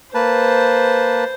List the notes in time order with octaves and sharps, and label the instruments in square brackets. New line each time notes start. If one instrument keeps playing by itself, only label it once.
[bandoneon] A#3 B4 A5 [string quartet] C5